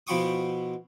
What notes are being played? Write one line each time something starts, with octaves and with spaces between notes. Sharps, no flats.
B2 F3 E4 G5 C#6 D#6